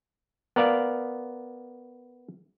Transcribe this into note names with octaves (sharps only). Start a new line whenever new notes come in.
B3 A#4 D5 F5